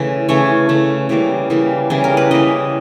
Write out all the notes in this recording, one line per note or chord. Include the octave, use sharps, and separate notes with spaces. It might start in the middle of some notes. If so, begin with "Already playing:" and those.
Already playing: C#3 E3 A3
C#3 E3 A3 C#5
C#3 E3 A3
C#3 E3 G3 A#3
C#3 E3 G3 A#3
C#3 E3 G3 A#3 G#4
A#4
B4
C#3 E3 G3 A#3 D#5